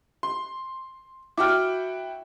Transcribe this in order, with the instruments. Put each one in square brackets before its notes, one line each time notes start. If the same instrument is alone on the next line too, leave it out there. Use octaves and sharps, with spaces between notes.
[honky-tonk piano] C6
[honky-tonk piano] E4 F#4 G5 [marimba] D6 F6